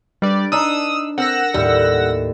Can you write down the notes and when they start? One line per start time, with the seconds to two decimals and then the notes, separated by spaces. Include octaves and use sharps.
0.22 G3 D4 B4 D5
0.52 D4 D#4 A5 D#6 E6
1.18 C4 A#4 F#5 E6 A#6
1.54 D#2 A2 G3